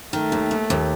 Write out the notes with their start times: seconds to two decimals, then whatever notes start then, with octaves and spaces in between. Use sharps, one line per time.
0.13 D#3 A3
0.32 D#2
0.51 D#2
0.70 D#2